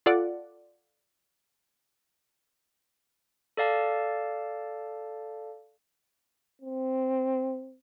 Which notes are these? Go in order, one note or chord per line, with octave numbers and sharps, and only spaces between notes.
F4 A4 D5 F#5
A4 D5 F5 A5
C4